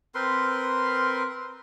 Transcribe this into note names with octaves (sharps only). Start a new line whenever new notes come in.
C4 A#4 B4 C6